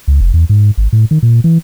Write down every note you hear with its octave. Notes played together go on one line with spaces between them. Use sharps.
C#2
F1
E2
G#2
G#1
A2
D#3
A#2
E3